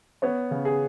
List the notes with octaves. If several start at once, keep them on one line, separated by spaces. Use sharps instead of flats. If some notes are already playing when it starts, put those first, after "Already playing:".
B3 C#5
C#3
G#4